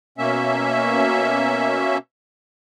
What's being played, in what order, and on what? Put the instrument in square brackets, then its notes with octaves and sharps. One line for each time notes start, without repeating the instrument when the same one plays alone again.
[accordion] B2 A#3 C#4 E5